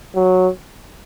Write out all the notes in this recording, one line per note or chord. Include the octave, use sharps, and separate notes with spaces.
F#3